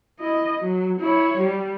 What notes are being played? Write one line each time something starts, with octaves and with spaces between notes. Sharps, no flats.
E4 D#5
F#3
E4 C#5
G3